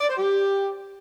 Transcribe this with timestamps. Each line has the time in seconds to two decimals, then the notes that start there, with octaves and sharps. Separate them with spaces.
0.01 D5
0.09 C5
0.17 G4